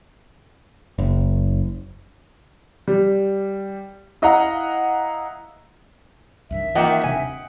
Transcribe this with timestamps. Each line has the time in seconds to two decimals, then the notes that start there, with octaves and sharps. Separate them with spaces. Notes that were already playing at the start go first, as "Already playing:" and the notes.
0.98 F#1
2.88 G3
4.22 E4 D#5 F5 F#5 A#5
6.50 C2 G2 D#3 E5
6.75 D#3 E3 A#3 F4 D#5 F#5 G5
7.04 D#1 C3 D4 G#5